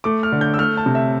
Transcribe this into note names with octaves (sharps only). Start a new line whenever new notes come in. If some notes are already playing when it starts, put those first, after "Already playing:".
A3 D6
F6
D3
G6
E6
A3 F6
A5
C3
E5